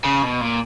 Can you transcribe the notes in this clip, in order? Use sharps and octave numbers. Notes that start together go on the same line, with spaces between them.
C#3
B2
A#2